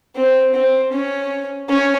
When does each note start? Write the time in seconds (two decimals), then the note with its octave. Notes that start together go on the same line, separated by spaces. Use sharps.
0.16 C4
0.54 C4
0.92 C#4
1.69 C#4